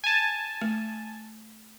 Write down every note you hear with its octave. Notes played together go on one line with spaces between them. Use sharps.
G#5 A5
A3